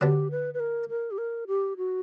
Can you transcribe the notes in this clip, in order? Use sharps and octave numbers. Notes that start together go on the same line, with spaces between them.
D3 F#3 B3 D4 G4
B4
B4
A#4
A#4
G4
A#4
G4
F#4